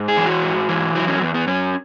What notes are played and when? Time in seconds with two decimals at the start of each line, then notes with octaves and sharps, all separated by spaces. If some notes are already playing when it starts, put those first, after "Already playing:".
Already playing: G#2
0.08 G#4
0.17 E3
0.25 F#4
0.43 G#2
0.69 E3
0.95 F#3 E4
1.08 C#4
1.21 E2 B3
1.34 B3
1.47 F#2 C#4